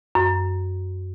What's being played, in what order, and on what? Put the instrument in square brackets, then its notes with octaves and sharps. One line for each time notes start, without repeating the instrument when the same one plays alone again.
[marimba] F#2